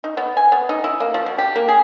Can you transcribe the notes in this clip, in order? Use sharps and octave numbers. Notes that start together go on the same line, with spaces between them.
D#4
B3
G#5
B3
D#4
E4
A#3
F3
B2
G4
A#3
G#4